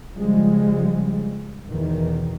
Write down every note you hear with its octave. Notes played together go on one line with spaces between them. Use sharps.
C#3 F3 G3 G#3
E2 B2 D#3